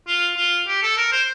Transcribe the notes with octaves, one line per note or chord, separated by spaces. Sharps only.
F4
F4
G4
A4
A#4
C5